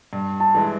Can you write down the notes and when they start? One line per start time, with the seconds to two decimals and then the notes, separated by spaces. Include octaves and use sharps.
0.13 G2
0.40 A5
0.55 E3 G#3